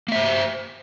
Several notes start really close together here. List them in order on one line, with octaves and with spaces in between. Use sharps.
A#3 E5 C5